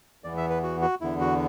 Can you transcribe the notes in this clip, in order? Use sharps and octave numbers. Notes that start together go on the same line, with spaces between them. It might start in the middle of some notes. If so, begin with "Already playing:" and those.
E2 E3 B3 D5
E5
B4
F#4
F#4
E2 D3 B3 E4
F#4